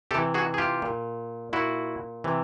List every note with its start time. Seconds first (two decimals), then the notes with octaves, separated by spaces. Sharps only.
0.11 C3 G4 A4
0.15 E3
0.34 F#4 G#4
0.54 G#4
0.58 F4 G4
0.82 A#2
1.53 A#2 E4 F#4
2.24 C3 E3